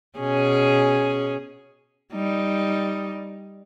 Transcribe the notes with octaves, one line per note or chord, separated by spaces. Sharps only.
B2 C#4 G#4
G3 D#4